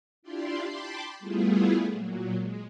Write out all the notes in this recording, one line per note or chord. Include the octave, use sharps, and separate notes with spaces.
D4 E4 F4 G4 D5 C6
G5 A5 B5 C6 D6
G3 A3 B3 E4 F4 G#4
A#2 F#3
G#3